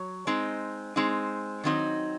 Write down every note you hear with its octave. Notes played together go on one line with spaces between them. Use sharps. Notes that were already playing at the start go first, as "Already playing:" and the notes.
Already playing: F#3 C#5
G#3 C4 D#4
G#3 C4 D#4
D#3 F#3 C4 D#4